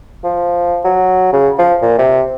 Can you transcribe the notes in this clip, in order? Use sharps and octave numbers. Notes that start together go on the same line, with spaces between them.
F3
F#3
C#3
F3
A#2
C3